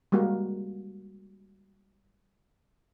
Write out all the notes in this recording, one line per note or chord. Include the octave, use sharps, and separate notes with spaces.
G3 G#3 A#3 F#4